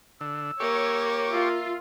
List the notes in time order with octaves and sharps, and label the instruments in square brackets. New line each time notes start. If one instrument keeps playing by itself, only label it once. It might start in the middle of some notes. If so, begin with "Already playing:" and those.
[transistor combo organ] D3 [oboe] E6
[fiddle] A#3 [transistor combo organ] G4 C#6 D6 [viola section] C#5
[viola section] F4 [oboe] E5